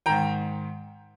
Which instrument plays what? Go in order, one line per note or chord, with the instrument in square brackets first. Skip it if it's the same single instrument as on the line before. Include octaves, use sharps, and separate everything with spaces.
[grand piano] G#2 D#3 G5 A#5